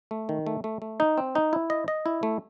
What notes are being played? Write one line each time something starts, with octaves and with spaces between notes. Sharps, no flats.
A3
D#3
A3
A3
A3
D#4
C4
D#4
E4
D#5
D#5
E4
A3